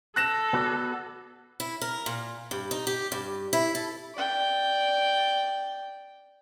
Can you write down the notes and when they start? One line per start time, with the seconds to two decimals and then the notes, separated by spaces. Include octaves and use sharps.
0.16 A4 F#6 A#6 E7
0.53 B3 F#4 D5
1.60 E4
1.82 A#4
2.06 A#2
2.51 G2
2.71 D#4
2.87 G4
3.12 G2
3.53 E4
3.75 A4
4.14 D5 G5